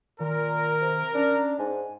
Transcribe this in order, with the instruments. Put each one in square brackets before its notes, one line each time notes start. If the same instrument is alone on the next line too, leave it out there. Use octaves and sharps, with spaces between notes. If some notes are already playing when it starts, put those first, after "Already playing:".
[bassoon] A#2 [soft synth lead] D#3 [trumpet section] A#4
[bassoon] C3
[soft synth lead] C#4 [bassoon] D4
[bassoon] G#2 [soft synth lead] G#5